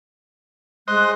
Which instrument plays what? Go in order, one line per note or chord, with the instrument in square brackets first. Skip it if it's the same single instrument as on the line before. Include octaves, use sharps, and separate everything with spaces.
[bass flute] G#3 [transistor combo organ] C5 D#5 [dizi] F#6